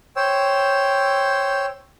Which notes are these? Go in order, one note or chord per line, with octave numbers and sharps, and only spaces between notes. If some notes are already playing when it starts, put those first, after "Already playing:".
C5 C#5 G5 E6